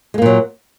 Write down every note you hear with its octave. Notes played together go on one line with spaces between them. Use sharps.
A#2 F#3 G#3 A#3